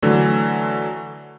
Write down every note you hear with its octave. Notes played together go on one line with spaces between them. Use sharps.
D3 E3 F#3 A3